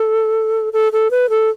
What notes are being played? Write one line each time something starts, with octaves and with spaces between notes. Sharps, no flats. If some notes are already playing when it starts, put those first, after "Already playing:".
Already playing: A4
A4
A4
B4
A4